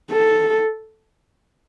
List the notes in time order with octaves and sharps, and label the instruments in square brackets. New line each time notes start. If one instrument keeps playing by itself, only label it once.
[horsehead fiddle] A4